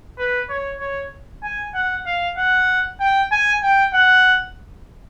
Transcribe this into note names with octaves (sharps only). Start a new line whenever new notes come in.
B4
C#5
C#5
G#5
F#5
F5
F#5
G5
G#5
G5
F#5